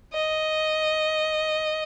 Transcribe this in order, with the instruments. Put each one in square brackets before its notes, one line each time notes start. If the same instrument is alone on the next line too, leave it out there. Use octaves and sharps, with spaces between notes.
[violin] D#5